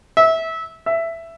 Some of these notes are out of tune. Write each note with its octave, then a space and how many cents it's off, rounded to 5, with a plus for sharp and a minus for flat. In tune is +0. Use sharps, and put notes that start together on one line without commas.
E5 -20
E5 +10